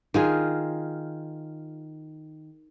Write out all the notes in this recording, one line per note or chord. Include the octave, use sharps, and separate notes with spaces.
D#3 F4 G#4